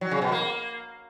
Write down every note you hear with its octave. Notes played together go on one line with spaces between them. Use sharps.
F#3
C#3
B2
A#3